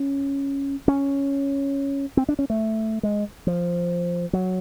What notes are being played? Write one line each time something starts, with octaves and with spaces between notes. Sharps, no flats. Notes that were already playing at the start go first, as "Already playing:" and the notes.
Already playing: C#4
C#4
C4
D4
C#4
A3
G#3
F3
F#3